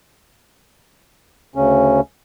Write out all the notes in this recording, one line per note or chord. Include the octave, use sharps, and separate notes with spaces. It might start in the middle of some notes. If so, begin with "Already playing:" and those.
D2 C#3 C#4